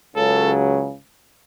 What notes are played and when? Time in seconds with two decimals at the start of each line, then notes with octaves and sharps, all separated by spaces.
0.15 C#2 C#3 F#3 A4